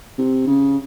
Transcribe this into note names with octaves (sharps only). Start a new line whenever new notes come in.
C3
C#3